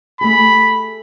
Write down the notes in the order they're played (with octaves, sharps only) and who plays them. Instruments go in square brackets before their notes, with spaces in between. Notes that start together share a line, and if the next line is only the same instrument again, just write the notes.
[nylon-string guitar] A3 G4 G#4 [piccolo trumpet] B5